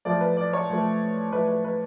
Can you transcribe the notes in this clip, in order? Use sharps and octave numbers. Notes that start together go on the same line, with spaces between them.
A2 F3 A3 D5
B4
D5
C#5
A2 F3 A3
A2 F3 A3 B4
B4
B4